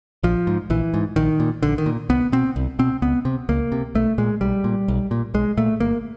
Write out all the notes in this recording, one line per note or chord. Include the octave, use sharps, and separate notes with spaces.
A#1 F3
G#2
A#1 E3
G#2
A#1 D#3
A#2
A#1 D3
D#3
A#2
C2 B3
B2 C4
C2
B2 C4
C#2 B3
C3
C#2 A#3
C3
B1 A3
A#2 G#3
B1 G3
A#2
B1
A#2
B1 G#3
A#2 A3
G1 A#3